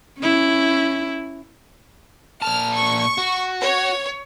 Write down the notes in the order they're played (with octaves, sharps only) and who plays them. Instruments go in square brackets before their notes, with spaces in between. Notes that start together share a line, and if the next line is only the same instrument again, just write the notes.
[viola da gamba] C#4 E4
[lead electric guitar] A#2 A5 [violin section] F6
[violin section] C#6
[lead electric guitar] F#4
[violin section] C#5